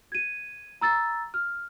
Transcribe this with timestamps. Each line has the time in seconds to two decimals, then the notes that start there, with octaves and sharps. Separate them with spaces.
0.12 G#6 D#7
0.81 A#5 E6 A6
1.34 F6